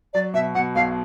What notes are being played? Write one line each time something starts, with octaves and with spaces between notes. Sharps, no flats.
F#3 D5
B2 E5
B2 F#5
B1 F5